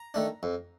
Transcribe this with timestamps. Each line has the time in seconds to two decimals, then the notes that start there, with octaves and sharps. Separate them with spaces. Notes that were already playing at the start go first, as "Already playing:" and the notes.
Already playing: A#5
0.14 D#3 A3 D4
0.43 F2